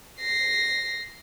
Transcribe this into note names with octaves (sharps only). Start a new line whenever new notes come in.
A#6 C7